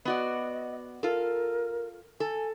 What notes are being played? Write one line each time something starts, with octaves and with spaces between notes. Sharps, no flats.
B3 F#4 D5 D#5
F4 A4 A#4
A4 G#5